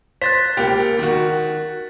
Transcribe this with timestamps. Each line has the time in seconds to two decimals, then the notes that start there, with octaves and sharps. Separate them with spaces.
0.22 C5 F#6 A6 B6
0.57 C#2 A#3 G4
0.99 D#3 F#4